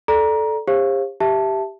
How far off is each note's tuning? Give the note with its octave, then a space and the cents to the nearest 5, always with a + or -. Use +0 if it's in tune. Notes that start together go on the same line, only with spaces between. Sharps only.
A4 -10 D5 +0 A#5 +20
G4 +40 C5 +35 F5 +0
G4 +0 E5 +5 A5 +0